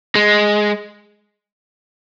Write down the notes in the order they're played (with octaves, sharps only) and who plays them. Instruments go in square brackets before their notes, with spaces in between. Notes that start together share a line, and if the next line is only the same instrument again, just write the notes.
[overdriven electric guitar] G#3